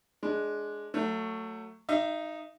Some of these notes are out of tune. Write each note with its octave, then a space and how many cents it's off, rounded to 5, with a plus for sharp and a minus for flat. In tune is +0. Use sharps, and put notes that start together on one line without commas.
G#3 +10 D4 +0
F#3 +0 A3 +20
D#4 +0 E5 +40